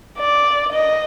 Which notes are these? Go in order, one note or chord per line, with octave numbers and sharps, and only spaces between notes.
D5
D#5